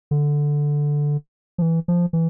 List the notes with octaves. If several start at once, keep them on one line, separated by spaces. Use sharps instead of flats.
D3
F3
E3
F3
E3